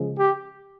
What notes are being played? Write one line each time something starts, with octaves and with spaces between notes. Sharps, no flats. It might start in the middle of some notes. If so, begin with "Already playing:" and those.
Already playing: C#3 F3 G#3
G4